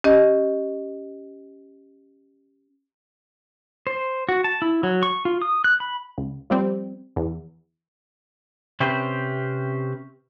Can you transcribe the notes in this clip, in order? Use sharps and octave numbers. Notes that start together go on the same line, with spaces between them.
C#4 G4 D#5
C5
F#4
A5
E4
F#3
C#6
F4
D#6
F#6
B5
C#2
F3 G3 C4
E2
C3 C4 C#4 G4 B4 C5